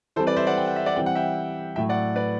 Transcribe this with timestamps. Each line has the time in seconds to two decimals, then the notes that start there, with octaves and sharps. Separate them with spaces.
0.16 E3 G3 C4 A4 C5
0.27 B4 D5
0.37 C5 E5
0.47 D5 F#5
0.57 G5
0.67 F#5
0.76 E5
0.86 D5 F#5
0.96 E3 G3 C4 G5
1.06 F#5
1.15 E5 G5
1.76 A2 F#3 A3 E5 G5
1.89 D5 F#5
2.16 B4 D5